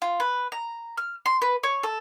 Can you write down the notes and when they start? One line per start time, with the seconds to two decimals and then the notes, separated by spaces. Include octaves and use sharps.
0.02 F4
0.20 B4
0.52 A#5
0.97 F6
1.26 C6
1.42 B4
1.64 C#5
1.83 A4